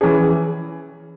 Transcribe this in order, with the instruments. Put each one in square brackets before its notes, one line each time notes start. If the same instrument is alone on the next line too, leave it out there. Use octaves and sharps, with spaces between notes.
[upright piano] E3 C#4 G#4